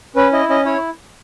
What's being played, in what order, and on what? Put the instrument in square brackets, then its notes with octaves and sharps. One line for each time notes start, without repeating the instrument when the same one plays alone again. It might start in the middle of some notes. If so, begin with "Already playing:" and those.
[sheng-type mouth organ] C#4 B4
E4 D#5
C#4 D#5
E4 C#5